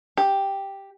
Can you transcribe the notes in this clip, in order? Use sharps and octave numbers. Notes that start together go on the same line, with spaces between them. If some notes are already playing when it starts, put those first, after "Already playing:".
G4